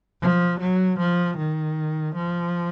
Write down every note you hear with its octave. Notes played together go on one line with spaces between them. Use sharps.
F3
F#3
F3
D#3
F3